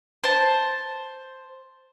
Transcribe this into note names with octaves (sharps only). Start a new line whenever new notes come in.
C5 A5